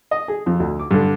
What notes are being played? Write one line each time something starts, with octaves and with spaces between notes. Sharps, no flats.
D#5
G#4
F2
D2
D6
G2 D3